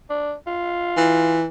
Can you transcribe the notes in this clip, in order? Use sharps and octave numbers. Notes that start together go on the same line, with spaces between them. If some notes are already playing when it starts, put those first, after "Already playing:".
D4
F4
E3